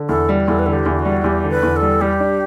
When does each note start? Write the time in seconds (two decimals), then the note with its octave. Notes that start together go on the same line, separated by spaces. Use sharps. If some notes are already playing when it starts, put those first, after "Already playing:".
Already playing: D3
0.09 E2 A4
0.29 G3
0.48 E2 A4
0.59 B4
0.66 D3 A4
0.73 G4
0.86 E2
0.99 F#4
1.05 G3
1.24 E2 G4
1.44 D3
1.51 B4
1.63 E2
1.76 A4
1.82 G3
2.01 G3 G4
2.20 D4